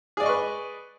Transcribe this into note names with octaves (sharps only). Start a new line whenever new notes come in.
G#4 B4 D5 D#5 C#6